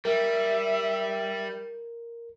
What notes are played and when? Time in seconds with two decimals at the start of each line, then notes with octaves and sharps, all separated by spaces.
0.05 G3 A#4 E5